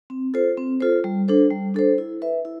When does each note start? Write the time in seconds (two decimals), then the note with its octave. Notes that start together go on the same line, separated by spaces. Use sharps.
0.10 C4
0.34 F4 A4 C5
0.57 C4
0.81 F4 A4 C5
1.04 G3
1.28 D4 A4 C5
1.51 G3
1.74 D4 A4 C5
1.98 E4
2.22 B4 E5
2.45 E4